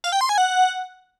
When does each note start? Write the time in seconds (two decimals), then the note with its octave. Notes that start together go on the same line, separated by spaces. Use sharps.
0.04 F5
0.12 G5
0.21 C6
0.29 G#5
0.38 F#5